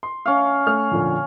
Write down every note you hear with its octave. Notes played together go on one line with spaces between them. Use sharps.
C6
C#4 F5
A3 F6
F2 A#2 D3